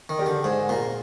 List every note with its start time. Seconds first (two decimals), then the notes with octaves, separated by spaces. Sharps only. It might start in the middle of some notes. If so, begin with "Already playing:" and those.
0.09 D#3
0.18 G4 A#4 D5
0.26 D3
0.44 G#2 G#4
0.69 A#2 D#5 A#5